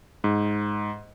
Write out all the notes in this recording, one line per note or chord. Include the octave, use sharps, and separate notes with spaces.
G#2